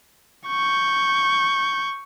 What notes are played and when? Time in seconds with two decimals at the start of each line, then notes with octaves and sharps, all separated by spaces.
0.47 C#6 G6